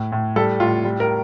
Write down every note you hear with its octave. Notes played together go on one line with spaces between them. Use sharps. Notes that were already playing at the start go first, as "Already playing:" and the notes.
Already playing: A2
A2
G3 A4
A2 F4
G3
A#4